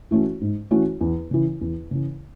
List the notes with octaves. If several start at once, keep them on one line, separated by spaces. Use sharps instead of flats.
E3 A3 C#4 F#4
G#2
E3 A3 C#4 F#4
E2
C#3 E3
E2
C#3 E3